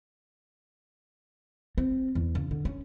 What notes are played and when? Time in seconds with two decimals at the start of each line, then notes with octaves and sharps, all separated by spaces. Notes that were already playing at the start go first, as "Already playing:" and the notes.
1.78 C4
2.15 E2
2.35 C#3
2.51 D3
2.65 C#4